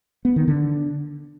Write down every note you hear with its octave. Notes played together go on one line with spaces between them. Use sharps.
B3
D#3
D3